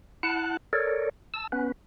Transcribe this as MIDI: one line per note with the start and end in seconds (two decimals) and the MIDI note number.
0.23 0.57 64
0.23 0.57 78
0.23 0.57 81
0.23 0.57 90
0.73 1.09 69
0.73 1.09 70
0.73 1.09 73
0.73 1.09 74
1.34 1.47 81
1.34 1.47 88
1.52 1.72 59
1.52 1.72 61
1.52 1.72 71